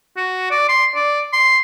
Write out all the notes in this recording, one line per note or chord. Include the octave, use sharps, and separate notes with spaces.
F#4
D5
C6
D5
C6